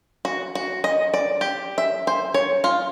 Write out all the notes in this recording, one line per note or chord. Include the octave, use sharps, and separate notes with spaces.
F#4
F#4
D#5
D5
G4
E5
C5
C#5
F4